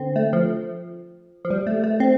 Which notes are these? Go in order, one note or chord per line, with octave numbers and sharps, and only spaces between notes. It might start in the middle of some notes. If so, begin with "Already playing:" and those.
Already playing: D3 C4
A3
F3
F3
G3
A3
A3
C4